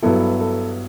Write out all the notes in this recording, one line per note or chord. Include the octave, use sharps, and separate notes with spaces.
G2 F#3 B3 E4 A4
A4